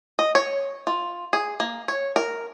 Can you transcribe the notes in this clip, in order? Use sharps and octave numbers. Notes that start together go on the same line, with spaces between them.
D#5
C#5
F4
G#4
A#3
C#5
A#4